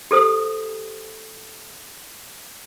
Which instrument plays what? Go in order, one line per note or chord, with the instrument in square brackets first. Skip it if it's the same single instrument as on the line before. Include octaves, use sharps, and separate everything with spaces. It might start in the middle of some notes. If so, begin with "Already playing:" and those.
[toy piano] G4 A4 C5 D#6